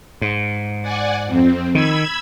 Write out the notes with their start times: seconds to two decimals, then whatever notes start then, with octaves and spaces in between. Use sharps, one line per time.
0.21 G#2
0.82 D5 F#5 G#5
1.25 F2 C4
1.75 D#3 B5 E6 G#6